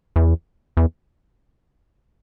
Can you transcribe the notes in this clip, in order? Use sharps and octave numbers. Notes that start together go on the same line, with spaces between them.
E2
E2